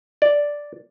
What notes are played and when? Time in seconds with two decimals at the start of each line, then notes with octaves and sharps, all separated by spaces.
0.22 D5